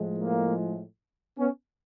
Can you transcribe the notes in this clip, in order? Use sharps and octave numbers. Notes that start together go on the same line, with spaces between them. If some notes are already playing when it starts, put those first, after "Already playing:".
Already playing: A2 F3 G#3
A#3
B3 C#4